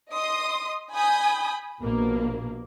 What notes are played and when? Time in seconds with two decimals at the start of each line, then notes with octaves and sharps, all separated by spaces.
0.11 D#5 C6 D#6
0.93 G#5 B5 D#6 G6
1.80 A#1 B2 A#3